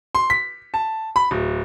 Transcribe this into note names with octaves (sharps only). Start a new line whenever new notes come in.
C6
B6
A5
B5
D1